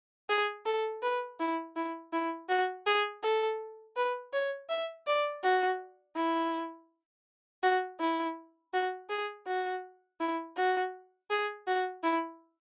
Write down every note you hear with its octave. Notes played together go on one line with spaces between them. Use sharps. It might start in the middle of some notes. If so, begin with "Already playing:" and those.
G#4
A4
B4
E4
E4
E4
F#4
G#4
A4
B4
C#5
E5
D5
F#4
E4
F#4
E4
F#4
G#4
F#4
E4
F#4
G#4
F#4
E4